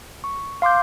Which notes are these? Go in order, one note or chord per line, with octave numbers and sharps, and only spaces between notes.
C#6
F5 C6 D6 G6